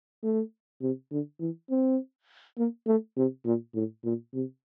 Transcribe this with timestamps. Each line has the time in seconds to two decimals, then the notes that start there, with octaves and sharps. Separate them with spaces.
0.24 A3
0.82 C3
1.11 D3
1.40 E3
1.70 C4
2.58 A#3
2.87 A3
3.17 C3
3.45 A#2
3.75 A2
4.05 A#2
4.34 C3